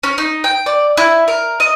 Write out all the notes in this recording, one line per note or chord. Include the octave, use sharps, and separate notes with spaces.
C#4
D#4
G5
D5
E4
A#4
D#5